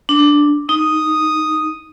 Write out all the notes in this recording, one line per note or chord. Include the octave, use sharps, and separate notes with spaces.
D4
D#4 D#6